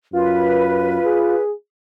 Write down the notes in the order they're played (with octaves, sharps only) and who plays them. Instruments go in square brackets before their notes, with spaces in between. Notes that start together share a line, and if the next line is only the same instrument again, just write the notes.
[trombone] F#2 [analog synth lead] F4 [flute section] B4
[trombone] G#4